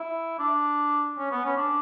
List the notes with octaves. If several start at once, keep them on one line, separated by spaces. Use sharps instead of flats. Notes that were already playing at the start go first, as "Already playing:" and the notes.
Already playing: E4
D4
C#4
B3
C#4
D4